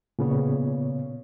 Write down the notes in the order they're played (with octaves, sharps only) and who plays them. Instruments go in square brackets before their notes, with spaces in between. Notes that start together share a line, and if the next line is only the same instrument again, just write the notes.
[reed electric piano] A#2 C#3 B3 C#5